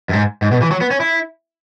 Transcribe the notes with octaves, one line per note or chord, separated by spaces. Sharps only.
F#2
G#2
G#2
B2
E3
F#3
B3
C#4
E4